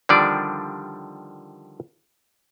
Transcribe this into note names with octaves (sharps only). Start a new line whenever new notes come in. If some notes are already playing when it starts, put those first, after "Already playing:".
D3 D#3 F3 G3 D4 D5